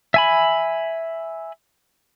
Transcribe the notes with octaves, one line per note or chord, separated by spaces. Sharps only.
E5 G#5 B5